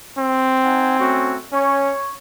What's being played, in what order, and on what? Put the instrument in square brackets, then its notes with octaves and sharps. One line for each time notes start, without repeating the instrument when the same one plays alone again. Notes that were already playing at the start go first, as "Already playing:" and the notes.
[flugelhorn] C4
[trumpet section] D#4 F#5 G#5
A3 C#4 F#4
[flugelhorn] C#4 [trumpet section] C#5